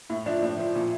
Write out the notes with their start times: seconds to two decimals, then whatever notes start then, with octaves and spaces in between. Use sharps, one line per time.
0.10 A2 E4
0.26 F3 D4
0.37 E4
0.43 A2 D4
0.59 F3
0.75 A#2 E4